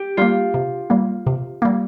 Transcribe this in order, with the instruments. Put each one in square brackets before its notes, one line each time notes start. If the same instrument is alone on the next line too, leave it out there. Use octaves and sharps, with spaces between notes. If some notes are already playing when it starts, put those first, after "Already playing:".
Already playing: [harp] G4
[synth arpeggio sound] G3 A#3 [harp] F4
[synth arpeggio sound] C3
G3 A#3
C3
G3 A#3